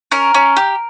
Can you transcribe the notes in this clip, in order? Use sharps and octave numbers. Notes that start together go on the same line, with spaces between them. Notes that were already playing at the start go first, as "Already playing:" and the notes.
C#4 A#4
C#4
G4